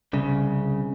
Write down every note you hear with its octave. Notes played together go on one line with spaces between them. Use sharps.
C2 C#3